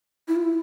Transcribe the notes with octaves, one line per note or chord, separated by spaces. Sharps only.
E4
F4
E4